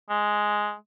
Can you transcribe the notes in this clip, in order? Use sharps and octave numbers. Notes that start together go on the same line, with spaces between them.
G#3